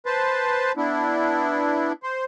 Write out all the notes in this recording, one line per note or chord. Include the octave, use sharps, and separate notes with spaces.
B4 C5 A5
B3 D4 E4
C5